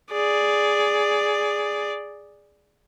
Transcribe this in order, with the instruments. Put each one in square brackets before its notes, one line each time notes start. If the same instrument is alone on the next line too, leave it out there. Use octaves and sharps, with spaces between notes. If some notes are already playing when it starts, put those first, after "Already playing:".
[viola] G#4 D5